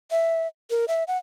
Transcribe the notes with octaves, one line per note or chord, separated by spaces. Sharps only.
E5
A#4
E5
F#5